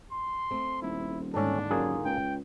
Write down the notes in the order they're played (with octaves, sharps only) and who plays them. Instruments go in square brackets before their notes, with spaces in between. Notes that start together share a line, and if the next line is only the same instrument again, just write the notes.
[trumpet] C6
[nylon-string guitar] A3 C4
[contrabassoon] D#1 [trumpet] E4
[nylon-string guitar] D#2 G#2 D3 [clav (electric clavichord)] C#4 A4 [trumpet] D4
[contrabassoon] F#2 [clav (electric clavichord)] A#3 F4 G#4
[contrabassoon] C#2 [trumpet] G5